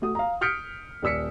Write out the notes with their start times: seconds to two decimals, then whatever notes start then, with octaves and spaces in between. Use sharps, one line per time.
0.02 A3 F#4 D#6
0.15 F5 A#5
0.41 D#6 F6 G6 B6 C#7 D7
1.03 D#1 D5 E6 B6 C#7